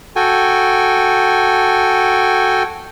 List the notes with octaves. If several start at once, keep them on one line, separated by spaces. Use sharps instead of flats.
F#4 A4 G5 G#5